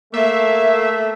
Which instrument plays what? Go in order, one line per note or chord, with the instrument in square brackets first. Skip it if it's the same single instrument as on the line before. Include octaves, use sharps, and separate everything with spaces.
[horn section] A3 [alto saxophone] A#3 [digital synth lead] E5